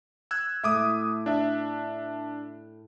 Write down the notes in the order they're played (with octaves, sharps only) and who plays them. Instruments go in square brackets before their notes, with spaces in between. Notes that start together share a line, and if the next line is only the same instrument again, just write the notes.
[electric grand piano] E6 F#6 G#6
[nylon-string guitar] A2 A3 [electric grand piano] E5 D6 D#6
[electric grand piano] D4 E5